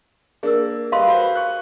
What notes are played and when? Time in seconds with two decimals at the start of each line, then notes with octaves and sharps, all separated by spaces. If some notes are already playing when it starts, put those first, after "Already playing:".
0.43 A#3 D4 G#4 A#4 E6
0.92 G3 B4 D#5 F5 C6
1.07 F#4 B4 C5
1.36 C#6 F#6